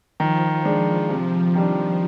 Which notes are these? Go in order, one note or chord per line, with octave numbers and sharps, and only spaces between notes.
D#3 F3
G#3 D4
C3
D#3 G3 D4